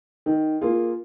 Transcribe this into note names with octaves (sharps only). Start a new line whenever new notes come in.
D#3
A#3 F4 G#4